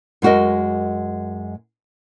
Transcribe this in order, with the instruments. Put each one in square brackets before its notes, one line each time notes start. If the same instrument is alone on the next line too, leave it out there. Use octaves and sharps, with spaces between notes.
[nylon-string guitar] F#2 G#3 F#4 A#4 D#5